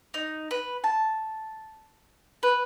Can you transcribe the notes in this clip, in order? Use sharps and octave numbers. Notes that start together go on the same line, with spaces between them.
D#4
B4
A5
B4